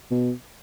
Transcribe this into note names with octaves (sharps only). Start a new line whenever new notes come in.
B2